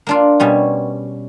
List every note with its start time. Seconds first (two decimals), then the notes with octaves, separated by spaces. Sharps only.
0.07 A#3 D4 F4
0.40 B2 G3 C#4